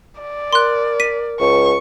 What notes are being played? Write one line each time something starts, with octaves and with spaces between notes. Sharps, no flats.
D5
A#4 C6 F#6
B6 D#7
C#2 C#6